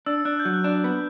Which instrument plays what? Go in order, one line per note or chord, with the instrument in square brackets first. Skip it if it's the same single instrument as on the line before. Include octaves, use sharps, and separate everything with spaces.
[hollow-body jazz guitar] D4 [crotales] E6
[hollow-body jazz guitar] D4 [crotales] F#6
[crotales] G6
[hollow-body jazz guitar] F#3
[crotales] F#6
[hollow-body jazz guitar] D4
B3